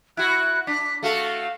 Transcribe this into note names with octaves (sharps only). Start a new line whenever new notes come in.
E4 F#4 F#6
D4 B6
A3 F#4 A4 F5